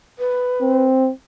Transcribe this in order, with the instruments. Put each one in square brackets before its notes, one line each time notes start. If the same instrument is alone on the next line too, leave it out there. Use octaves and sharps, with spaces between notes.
[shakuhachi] B4
[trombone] C4